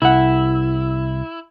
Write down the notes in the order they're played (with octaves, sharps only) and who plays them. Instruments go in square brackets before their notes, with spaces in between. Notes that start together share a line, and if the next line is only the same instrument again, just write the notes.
[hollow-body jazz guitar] C2 F#5 [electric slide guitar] E4